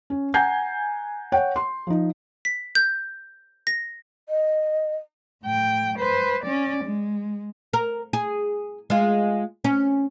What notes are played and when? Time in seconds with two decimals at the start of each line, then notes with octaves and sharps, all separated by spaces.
0.10 C#4
0.34 F#5 G#5 A#5 G6 C7
1.32 C#5 F#5 G5
1.56 C6
1.87 F3 D#4
2.45 B6
2.75 G6
3.67 A#6
4.29 D#5
5.44 A2 G5
5.98 B4 C5
6.44 C#4 D5
6.84 G#3
7.73 A#4
8.13 G#4
8.90 G#3 F4
9.64 C#4